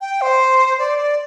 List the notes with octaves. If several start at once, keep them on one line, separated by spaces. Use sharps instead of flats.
G5
C5
D5
D5